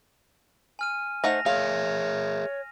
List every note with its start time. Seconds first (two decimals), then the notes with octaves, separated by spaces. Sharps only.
0.79 G#5 F6 D#7
1.24 A3 D#4 C5 F#5 A#6 F7
1.46 G#4 A#4 C#5 E5 F5